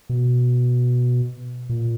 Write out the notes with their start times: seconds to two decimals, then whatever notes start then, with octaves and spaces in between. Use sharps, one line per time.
0.09 B2
1.69 A#2